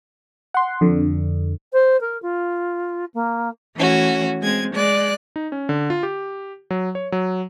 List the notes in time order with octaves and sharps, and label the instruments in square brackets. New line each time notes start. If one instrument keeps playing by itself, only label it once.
[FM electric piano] F#5 C6
F2 D3
[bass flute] C5
A#4
F4
A#3
[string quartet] E3 A3 C#4 F#4
G#3 C4 G#6
G#3 D5 F#6
[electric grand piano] D#4
C#4
D3
F4
G4
F#3
C#5
F#3